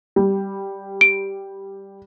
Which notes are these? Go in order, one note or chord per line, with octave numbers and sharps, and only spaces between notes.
G3
D7